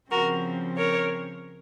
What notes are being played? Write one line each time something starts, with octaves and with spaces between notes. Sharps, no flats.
C#3 F3 C4 F#4 A#4
A#4 C#5